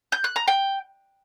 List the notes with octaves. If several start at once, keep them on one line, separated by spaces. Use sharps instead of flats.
G6
F#6
A#5
G5